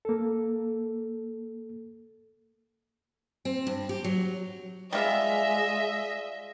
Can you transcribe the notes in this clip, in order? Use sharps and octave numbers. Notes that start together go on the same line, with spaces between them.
A#3 A4
C4
G2
G4
F#3
G3 G#3 F4 D#5 E5